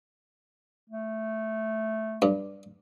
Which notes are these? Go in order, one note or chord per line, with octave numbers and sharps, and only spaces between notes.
A3
G2